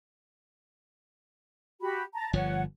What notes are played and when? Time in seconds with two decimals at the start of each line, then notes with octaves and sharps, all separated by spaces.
1.80 F#4 G4 B5
2.14 A5 A#5
2.33 G1 F3 C#5 F#5